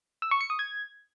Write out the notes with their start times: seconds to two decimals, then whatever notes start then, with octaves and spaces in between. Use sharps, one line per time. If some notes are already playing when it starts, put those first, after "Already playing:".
0.22 E6
0.31 C#6
0.41 C#7
0.50 D#6
0.59 G#6